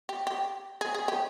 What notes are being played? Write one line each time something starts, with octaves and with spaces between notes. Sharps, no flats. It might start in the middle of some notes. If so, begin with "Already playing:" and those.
G4
G4
G#4
G#4
G4